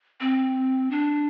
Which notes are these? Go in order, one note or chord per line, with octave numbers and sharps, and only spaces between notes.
C4
D4